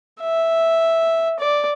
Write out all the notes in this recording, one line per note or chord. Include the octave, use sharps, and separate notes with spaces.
E5
D5